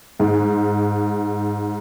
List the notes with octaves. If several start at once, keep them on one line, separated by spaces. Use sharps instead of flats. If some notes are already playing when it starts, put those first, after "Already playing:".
G#2